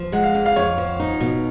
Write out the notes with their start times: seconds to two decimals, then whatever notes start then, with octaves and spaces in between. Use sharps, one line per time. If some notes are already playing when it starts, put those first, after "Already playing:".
Already playing: F3
0.12 G#3 F#5
0.24 F5
0.35 F2
0.46 F5
0.56 F2 C#5
0.78 F3
1.00 D#4
1.20 B2